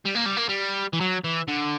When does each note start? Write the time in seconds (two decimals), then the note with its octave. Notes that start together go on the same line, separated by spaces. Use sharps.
0.06 G3
0.15 A#3
0.26 G3
0.37 A#3
0.49 G3
0.93 E3
1.01 F#3
1.24 E3
1.48 D3